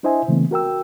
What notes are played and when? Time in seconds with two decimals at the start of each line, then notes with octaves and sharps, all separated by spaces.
0.03 D4 E4 C5 D#5 E5 G#5
0.28 C#3 E3 A3 B3 C4
0.51 F#4 A#4 G5 E6